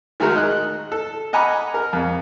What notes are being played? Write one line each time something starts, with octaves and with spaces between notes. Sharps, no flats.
D#3 G#3 A3 F#4 A4 A#4
D#5 F#6
A4
D#5 F#5 G#5 A#5 B5 D6
A#4
F2